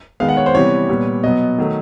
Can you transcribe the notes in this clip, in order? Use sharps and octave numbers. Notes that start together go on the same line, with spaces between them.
D#3 G#3 B3 F5
F#5
C#5
C5
C3 E3 G3 B3 C#5
A#2 G3 B3
B2 F#3 B3 D#5
D#3 F#3 A3